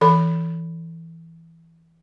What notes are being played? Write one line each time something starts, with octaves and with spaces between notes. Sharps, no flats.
E3 A4 B5